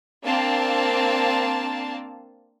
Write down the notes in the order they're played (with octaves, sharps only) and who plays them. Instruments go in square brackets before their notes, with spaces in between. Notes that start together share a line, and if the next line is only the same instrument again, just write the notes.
[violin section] A#3 C4 D4 F5 A5